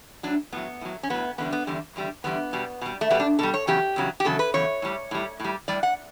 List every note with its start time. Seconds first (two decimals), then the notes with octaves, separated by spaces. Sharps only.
0.23 A2 F#3 D4
0.52 A2 F#3 B3
0.81 A2 F#3
1.03 C#4
1.10 A2 F#3 B3
1.38 E2 D3 G3 B3
1.52 B3
1.67 E2 D3 G3
1.96 E2 D3 G3
2.24 E2 D3 G3 B3
2.53 B2 G3
2.81 B2 G3
3.01 A3
3.10 B2 G3 B3
3.20 D4
3.39 B2 G3 A4
3.54 C#5
3.67 E2 C#3 F#3 G4
3.96 E2 C#3 F#3
4.20 G4
4.25 E2 C#3 F#3 A4
4.39 B4
4.54 E2 C#3 F#3 C#5
4.82 A2 G3
5.11 A2 G3
5.40 A2 G3
5.68 A2 G3 D5
5.83 F#5